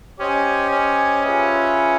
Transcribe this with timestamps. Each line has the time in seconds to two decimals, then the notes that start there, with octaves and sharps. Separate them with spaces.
0.19 C#4 G4 C5 D#5 G#5
0.71 C#4
1.23 F4 G#4 B4 E5